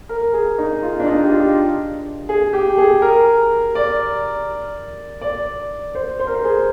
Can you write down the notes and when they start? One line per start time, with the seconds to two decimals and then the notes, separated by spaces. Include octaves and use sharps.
0.09 A#4
0.33 G#4
0.58 D#4
0.83 F4
1.00 D4
1.07 D#4
1.23 G4
1.31 F4
2.29 G#4
2.53 G4
2.78 G#4
3.02 A#4
3.75 D5
5.21 D5
5.95 C5
6.19 C5
6.27 A#4
6.34 C5
6.44 G#4